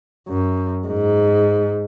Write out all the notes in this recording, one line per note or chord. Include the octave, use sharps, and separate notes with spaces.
F#2
G#2